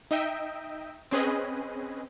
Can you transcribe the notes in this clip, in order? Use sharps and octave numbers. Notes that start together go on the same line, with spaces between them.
D#4 D#5 E5 G5
C4 C#4 G#4 B4 D#5